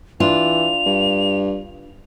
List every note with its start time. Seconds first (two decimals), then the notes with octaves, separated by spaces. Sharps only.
0.20 E3 D4 F4 F7
0.86 G2